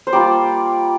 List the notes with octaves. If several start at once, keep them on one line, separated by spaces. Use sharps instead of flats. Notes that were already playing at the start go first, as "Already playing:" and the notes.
C5
G3 A#3 F4 D5